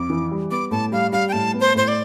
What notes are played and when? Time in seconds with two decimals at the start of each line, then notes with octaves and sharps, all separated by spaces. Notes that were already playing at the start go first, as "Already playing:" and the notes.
Already playing: F2 D6
0.10 E3
0.31 G3
0.51 B3 D6
0.71 A2 A5
0.92 G3 F5
1.12 G3 F5
1.29 G5
1.32 A2 A5
1.53 B3
1.61 C5
1.75 A2 C5
1.88 D5